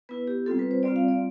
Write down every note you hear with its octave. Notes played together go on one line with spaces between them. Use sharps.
B3 E4 B4
G4
G3 C4 F4 A4
B4
C5
G3 C4 F4 D5
F5
D5